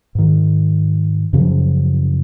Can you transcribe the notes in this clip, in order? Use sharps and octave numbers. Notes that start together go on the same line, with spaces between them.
G#2 D#3
F#2 C#3 F3 F#3